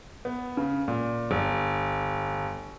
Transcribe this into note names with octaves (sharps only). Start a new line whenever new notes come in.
B3
C#3
A#2
G1